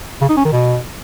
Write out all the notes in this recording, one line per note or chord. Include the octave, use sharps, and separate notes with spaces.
C#3
D#4
C#4
D#3
B2